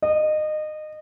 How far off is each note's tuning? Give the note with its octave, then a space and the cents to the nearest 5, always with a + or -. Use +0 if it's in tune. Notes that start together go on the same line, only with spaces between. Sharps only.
D#5 -25